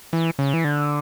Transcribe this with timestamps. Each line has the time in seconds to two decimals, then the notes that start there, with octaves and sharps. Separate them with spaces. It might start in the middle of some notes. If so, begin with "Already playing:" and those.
0.13 E3
0.39 C#3
0.54 E3
0.64 D3